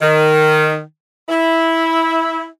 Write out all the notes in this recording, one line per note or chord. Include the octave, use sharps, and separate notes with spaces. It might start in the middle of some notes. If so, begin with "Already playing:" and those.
D#3
E4